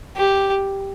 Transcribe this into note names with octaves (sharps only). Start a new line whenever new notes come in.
G4